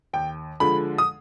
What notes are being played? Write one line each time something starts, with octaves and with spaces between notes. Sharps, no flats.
D#2 G5
D3 F3 G#3 B5
D#6